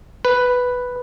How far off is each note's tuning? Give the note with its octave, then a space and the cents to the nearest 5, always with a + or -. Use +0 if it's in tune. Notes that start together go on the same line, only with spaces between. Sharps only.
B4 +0